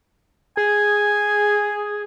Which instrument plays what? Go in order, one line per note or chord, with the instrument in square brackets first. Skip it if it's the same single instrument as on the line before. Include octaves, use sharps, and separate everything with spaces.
[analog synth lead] G#4 [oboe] G#5